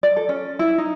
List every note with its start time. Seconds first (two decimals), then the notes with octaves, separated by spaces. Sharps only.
0.03 D5
0.16 A4
0.29 C#4
0.59 E4
0.78 D#4